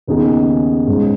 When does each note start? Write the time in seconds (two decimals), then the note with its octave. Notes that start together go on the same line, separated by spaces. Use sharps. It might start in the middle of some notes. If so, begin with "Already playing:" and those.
0.07 D#2 C#3 B3 D#4 G#4
0.87 G#2 G#3 C#4